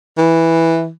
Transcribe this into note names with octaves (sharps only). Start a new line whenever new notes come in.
E3